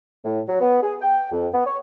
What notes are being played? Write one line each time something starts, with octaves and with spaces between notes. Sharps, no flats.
A2
F#3
B3
G#4
G5
F2
B3
C#5